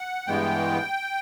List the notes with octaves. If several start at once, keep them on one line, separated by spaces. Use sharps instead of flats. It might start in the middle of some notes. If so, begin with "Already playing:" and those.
Already playing: F#5
G2 E3 G#3 B3 G5